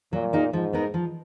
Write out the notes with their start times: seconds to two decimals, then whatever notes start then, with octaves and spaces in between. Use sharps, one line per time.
0.13 A#2 F#3
0.33 A#3 D#4 G#4
0.53 G#2 F3
0.73 B3 D#4 A#4
0.94 F3